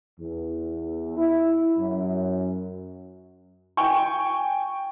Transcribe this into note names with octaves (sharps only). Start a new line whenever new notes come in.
E2
E4
F#2
G5 G#5 C#6